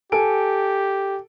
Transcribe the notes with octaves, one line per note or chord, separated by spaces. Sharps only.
G4 A4 G#5 D7